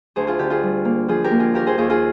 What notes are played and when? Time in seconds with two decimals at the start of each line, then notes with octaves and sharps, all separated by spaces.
0.16 D2 G#4 C5
0.27 F4 G#4
0.39 D3 G4
0.50 F4 G#4
0.63 G3
0.85 A#3
1.08 F3 F4 G#4
1.24 G4 A#4
1.32 A#3
1.39 F4 G#4
1.54 D#2 G4 A#4
1.67 G#4 C5
1.78 D#2 F4 G#4
1.90 F4 G#4